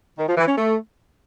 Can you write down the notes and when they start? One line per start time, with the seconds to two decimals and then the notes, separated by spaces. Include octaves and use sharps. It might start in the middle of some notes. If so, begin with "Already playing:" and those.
0.18 D#3
0.28 F3
0.37 E3
0.47 C#4
0.57 A3